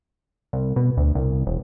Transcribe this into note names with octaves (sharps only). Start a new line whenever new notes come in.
C2
B2
D2
C2
E1